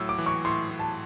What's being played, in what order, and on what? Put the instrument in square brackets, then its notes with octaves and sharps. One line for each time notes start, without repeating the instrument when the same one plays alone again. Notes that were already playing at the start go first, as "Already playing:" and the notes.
Already playing: [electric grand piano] A2 F#3 [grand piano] E6
[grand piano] D6
[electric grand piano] E3
[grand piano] C#6
[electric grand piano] A2 [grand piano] C6
[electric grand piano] A2
[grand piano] A5